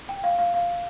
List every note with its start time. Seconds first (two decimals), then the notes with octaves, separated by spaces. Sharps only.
0.09 G5
0.24 F5
0.38 F5
0.54 F5